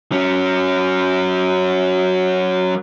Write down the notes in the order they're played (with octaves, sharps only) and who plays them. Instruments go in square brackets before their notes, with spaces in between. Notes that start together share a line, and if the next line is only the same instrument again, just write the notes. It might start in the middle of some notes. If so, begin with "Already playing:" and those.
[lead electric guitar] F#3 C#4